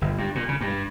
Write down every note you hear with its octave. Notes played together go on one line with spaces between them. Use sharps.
G1
G2
A#2
C#3
G2